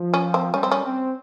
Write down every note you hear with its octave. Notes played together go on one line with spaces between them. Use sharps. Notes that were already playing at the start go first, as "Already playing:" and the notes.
Already playing: F3
C#4
C4
G3 C#4
C4
C#4
C4